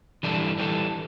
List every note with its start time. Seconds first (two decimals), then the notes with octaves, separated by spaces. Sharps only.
0.23 E3 G3 D4 A4
0.58 E3 G3 D4 A4